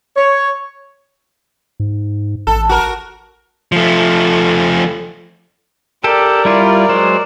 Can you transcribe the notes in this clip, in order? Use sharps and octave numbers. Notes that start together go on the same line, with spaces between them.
C#5
G#2
A1 A4
F#4 A#4
F3 A3
G4 A4 A#4 D5
G3 E4 F4
F#3 G#3 C5